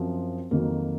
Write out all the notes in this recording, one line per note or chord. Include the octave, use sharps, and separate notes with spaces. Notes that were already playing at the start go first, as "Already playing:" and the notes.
Already playing: F#2 F3 C4
F2 D#3 F#3 A#3